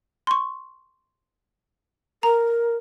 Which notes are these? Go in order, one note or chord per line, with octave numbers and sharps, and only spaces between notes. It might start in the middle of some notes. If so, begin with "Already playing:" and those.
C6 C#6
A#4 A#5